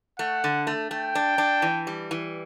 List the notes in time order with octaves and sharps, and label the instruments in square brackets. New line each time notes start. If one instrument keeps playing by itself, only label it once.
[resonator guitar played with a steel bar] A3 [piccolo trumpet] F#5
[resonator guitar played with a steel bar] D3
A3
[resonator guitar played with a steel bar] A3 [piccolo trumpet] G5
[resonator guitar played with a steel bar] D4
D4
E3
G3
E3